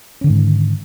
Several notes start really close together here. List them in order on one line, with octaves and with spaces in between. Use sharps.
C#4 D3 D#3 G#2